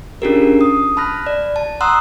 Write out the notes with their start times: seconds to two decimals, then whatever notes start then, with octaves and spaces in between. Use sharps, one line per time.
0.22 C#4 D4 F4 G4 G#4 A#4
0.61 D#6
0.97 A5 B5 F6 F#6 A#6
1.27 D5
1.56 A5
1.81 F#5 A#5 C6 D#6 E6 F#6